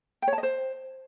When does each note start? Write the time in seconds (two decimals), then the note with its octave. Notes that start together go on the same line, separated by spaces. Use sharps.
0.22 G5
0.28 C#5
0.33 A5
0.38 D#5
0.43 C5